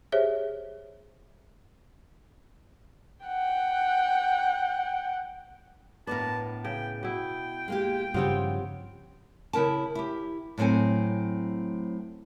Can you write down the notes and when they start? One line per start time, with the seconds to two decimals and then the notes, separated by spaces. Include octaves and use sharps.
0.12 G4 G#4 C5 C#5 E5
3.26 F#5 G5
6.07 A2 B3 D4 A#4 B4 A5
6.64 C#3 G5
7.03 B2 E4 G5
7.68 G#3 A#3 G4
8.14 G2 C#3 F3 B3 C4 F4 G4 C#5
9.53 C#3 E4 A#4 A5
9.95 E4 G4
10.58 A2 F#3 C4 A4 G#5